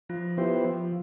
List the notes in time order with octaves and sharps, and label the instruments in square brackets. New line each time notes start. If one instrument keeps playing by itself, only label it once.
[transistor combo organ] F3 [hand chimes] F4
[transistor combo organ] B3 E4 G4 C5
F3